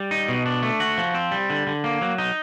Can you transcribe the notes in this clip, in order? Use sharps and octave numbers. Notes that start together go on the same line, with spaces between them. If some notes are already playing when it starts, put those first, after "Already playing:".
Already playing: G3
D#4
B2
D4
A3
F#4
F3
C4
G3
D3
D3
A#3
F#3
D#4